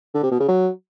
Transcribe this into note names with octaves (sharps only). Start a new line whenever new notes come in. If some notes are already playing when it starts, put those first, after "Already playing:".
D3
C3
B2
C#3
F#3